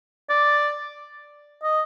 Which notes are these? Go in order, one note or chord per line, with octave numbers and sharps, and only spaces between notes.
D5
D#5